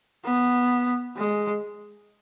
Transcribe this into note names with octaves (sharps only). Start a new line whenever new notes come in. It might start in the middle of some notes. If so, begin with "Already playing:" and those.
B3
G#3